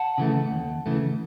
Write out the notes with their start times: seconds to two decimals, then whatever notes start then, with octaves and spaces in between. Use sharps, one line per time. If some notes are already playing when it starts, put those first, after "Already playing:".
Already playing: F#5 A5
0.18 C#3 E3 A3
0.51 D#2
0.86 C#3 E3 A3